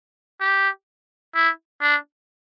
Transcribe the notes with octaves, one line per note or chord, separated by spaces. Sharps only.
G4
E4
D4